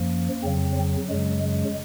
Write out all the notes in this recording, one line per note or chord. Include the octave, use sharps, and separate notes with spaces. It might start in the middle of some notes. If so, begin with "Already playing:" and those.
Already playing: F#2 F3 A#3
F2 C#3 F#3 C4
F#3
F#2 C#3 F#3 G#3
G#3